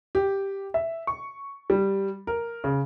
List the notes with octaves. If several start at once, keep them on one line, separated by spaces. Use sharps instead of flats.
G4
E5
C#6
G3
A#4
C#3